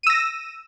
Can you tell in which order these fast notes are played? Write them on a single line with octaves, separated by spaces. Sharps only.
D#7 E6 A#6